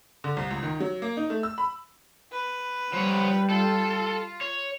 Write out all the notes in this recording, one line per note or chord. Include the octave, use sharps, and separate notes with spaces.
D3
C2
C#2
D#3
F#3
A#3
D#4
A3
E6
B5
B4
F3 G3 C#5
F4 A4
C#5